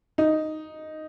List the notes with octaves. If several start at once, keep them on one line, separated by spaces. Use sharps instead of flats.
D#4